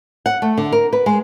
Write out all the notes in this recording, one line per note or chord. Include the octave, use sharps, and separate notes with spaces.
F#5
A3
D3
A#4
B4
G#3